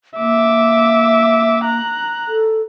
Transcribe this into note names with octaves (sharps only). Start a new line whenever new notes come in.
A#3 E5 D6
A#5 F#6
A4